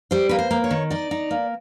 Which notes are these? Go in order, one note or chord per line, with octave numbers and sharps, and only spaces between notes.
G3 C5
A#3 B4
C5
A#3
C#5
D#3
D#4 D5
D#4
A#3